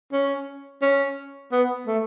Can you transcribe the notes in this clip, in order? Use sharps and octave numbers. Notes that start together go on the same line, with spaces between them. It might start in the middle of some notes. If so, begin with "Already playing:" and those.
C#4
C#4
B3
A3